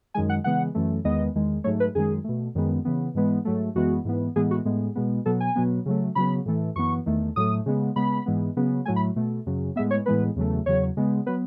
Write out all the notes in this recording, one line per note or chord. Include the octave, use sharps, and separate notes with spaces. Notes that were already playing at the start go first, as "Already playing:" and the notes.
F#2 D#3 G#3 G#5
F#5
C#3 E3 G#3 B3 F#5
F#2 E3 A3
E2 D#3 G#3 B3 D#5
E2 D#3 G#3
G#2 F#3 A3 C#5
B4
F#2 D#3 G#3 G#4
B2 A3
F#2 D#3 G#3 B3
C#3 E3 B3
G#2 E3 G#3 B3
G#2 F#3 A3
F#2 E3 G#3 B3 F#4
G#2 E3 B3
A2 E3 G#3 B3 G#4
F#4
A2 G#3 B3
B2 G#3 B3
B2 F#3 B3 A4
G#5
B2 F#3 B3
C#3 F#3 A3
C#3 F#3 B3 B5
A2 E3 A3
F#2 E3 B3 C#6
E2 D#3 A3
A2 F#3 A3 D#6
C#3 G#3 B3
C#3 G#3 B3 B5
G#2 E3 G#3 B3
C#3 F#3 B3
A2 F#3 A3 G#5
B5
B2 A3
F#2 C#3 F#3
A2 G#3 B3 E5
C#5
A2 E3 G#3 B3 B4
E2 C#3 F#3 A3
E2 C#3 F#3 C#5
C#3 G#3 B3
F#3 B3 B4